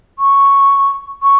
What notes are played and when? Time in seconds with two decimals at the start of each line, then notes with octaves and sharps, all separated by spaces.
0.19 C#6
1.23 C#6